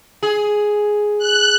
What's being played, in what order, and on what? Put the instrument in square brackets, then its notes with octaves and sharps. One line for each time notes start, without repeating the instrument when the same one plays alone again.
[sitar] G#4
[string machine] F#6